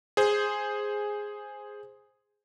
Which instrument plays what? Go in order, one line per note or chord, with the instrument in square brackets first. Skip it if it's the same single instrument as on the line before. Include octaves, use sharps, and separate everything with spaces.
[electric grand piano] G#4 C5